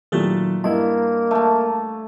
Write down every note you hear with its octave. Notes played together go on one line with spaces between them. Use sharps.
A#2 D#3 F#3 A3 G4 A4
G2 A#3 E4 D#5
A3 A5